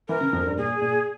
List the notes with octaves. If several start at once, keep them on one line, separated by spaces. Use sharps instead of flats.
E3 A#4
C#3
F2
G2
A#2 G#4
A#2